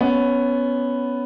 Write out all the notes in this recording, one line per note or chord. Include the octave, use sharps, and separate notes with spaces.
B3 C#4